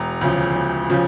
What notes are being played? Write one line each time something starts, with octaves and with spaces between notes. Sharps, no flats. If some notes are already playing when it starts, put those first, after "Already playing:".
Already playing: E1 A#5
D2 C#3 F3
E1
C#3 F3